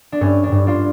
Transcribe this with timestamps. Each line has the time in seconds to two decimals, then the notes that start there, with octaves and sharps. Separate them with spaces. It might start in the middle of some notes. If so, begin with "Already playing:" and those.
0.12 D4
0.21 G2 C#4
0.44 D4
0.52 G2
0.67 D4 F4